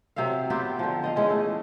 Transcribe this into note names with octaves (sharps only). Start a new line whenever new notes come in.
C3 F#3 E5 F5
F#3 B3 F4 G4
D3 F3
G4 D#5 F5
E3 G#3 C#4
A3